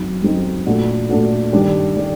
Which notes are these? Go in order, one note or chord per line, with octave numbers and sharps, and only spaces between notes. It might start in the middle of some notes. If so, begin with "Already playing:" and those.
Already playing: F#2 F#3 C4 D#4
F#2 F#3 C4 D#4
A#2 A3 D4 F#4
A#2 A3 D4 F#4
G2 D#3 G3 D4 G4
D#3 G3 D4 G4